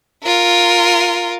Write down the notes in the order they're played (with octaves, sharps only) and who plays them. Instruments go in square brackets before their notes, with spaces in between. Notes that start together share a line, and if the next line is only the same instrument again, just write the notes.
[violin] F4 A#4